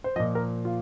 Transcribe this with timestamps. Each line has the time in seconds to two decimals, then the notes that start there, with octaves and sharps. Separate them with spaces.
0.04 C5
0.16 A#2 F3 D#5
0.35 A#4
0.65 F4